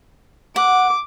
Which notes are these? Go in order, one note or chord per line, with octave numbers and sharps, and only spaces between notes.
F#5 D6